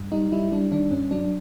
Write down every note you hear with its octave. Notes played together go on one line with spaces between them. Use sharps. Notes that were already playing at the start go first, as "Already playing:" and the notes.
Already playing: G2
G3 D#4
G3 E4
G3 D4
D#3 D4
G2 C#4
F#3 D4